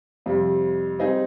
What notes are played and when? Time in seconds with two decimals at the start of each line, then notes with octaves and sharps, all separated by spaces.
0.26 F2 C3 G3
0.99 G3 C4 D#4 G#4